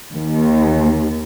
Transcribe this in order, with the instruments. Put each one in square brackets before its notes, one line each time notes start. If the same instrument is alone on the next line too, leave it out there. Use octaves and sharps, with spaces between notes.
[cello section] D#2